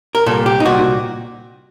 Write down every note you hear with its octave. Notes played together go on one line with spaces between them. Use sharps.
A#4
C2 A#2 A4
G4
D#4
C2 A#2 F#4